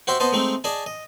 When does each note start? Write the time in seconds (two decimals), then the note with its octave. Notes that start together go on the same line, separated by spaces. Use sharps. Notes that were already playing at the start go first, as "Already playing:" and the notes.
0.07 F#4 G4 C5 E5 G5
0.20 B3 C5 D#5 A5
0.32 G#3 A3 C4 D#4
0.64 G#4 D5 D#5 A5
0.86 D#5